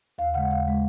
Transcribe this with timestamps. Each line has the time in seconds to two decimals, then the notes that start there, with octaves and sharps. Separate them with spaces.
0.18 D#2 F5
0.34 C#3 G#3 F#5
0.51 D#2 F5
0.66 C#3 G#3